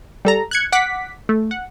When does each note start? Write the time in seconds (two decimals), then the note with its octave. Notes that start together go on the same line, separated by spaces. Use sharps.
0.25 G3 A4 A#5
0.51 F#6 G#6 C#7
0.72 F#5 D6 B6
1.29 A3
1.51 F#5